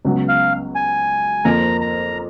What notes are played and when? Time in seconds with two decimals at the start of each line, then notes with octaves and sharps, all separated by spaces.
0.05 C#2 C#3 F#3 B3
0.28 F5
0.75 G#5
1.45 F2 F3 A#3 A#5
1.81 A#5